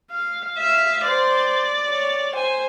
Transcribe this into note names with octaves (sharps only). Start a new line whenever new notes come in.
F5
E5 F5
C5 D5
C#5
C5 G#5